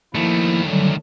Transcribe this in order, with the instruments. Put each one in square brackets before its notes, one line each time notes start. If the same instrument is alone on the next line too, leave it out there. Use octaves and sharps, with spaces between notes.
[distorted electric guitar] D#3 A3 [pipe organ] F3 A#3 E4
[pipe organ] D3 F#3 G3